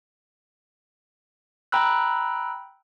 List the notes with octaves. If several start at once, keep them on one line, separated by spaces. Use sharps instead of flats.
G5 A#5 B5 E6 F#6